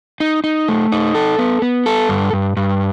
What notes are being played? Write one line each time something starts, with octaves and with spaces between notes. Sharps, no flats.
D#4
D#4
A3
D#4
A4
B3
B3
A4
G2
G2
G2